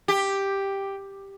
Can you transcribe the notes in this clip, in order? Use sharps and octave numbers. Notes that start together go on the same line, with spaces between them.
G4